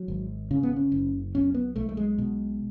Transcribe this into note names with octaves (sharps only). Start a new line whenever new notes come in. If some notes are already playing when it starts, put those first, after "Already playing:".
Already playing: F#3
G#1
C#3 C#4
B3
C#4
F#1
B1 C#4
B3
B1 A3
A3
G#3
B2